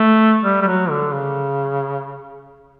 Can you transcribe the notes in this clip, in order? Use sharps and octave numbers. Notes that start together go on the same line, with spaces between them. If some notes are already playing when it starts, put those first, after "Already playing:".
Already playing: A3
G3
G3
F#3
D3
C#3